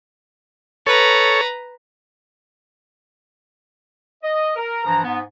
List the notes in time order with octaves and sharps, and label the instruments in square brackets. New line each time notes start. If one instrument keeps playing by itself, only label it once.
[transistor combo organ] A4 C#5 [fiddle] B4 A#5
[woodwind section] D#5
A#4
G2 E3 F3 A#5
G#2 B3